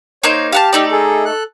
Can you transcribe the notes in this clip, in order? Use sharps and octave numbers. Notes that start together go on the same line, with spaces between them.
A#3 D#4 C5 C#5
G4 F5 F#5 A5
A3 D#4 D5
G#4 A4
A4 F#6